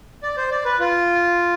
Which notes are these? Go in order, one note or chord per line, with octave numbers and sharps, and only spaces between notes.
D5
C5
D5
B4
F4